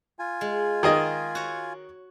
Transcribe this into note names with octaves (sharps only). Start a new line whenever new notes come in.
F4 G#5
G#3
D#3 G#4 D#5
F#4 C#5